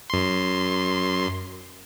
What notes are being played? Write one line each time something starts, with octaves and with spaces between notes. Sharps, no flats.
F#2 C6